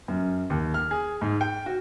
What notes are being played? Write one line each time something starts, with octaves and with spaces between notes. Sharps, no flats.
F#2
D#2
F6
G#4
G#2
G5
F#4